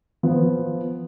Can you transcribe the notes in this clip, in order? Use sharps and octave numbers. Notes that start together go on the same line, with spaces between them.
F3 B3